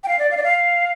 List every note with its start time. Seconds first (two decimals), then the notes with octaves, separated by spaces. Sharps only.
0.04 G5
0.08 F5
0.19 D5
0.31 F5
0.37 D5
0.43 F5